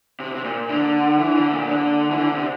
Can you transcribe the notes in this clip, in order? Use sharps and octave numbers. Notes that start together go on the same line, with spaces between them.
C3
C3
A#2
D3
E3
D3
A#2
D3
E3
D3
C3